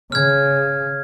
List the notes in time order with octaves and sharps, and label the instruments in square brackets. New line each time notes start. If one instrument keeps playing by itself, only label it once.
[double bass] C#3 [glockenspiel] F6 G#6